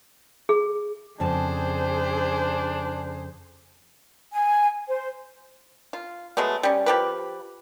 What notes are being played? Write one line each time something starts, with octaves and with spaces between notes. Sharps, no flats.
G#4
F2 C#3 D4 G#4 C5 A5
G#5
C5
F4
F#3 G#3 A3 B3
G3 C#4
F3 G4 B4